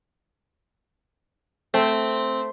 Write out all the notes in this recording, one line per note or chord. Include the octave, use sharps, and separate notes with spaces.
A3 C4